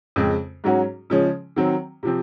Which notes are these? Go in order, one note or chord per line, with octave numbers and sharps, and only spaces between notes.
F2 C#3 G#3 C4
G#2 F#3 C#4 F#4
C#3 F3 G#3 C#4
D#3 F#3 C4
C3 F3 C4